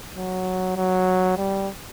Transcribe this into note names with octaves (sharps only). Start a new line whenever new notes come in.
F#3
F#3
G3